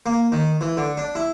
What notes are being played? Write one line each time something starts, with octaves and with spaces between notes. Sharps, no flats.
A#3
D#3
E3
D3
D4
E4